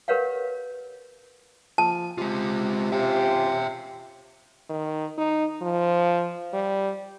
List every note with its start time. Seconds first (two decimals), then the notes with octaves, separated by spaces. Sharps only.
0.08 G4 A#4 B4 C#5 F5 F#5
1.78 F3 A5
2.18 C3 G#3 F4
2.92 C#4 F4 G4 E5 G5
4.70 D#3
5.18 D#4
5.62 F3
6.53 G3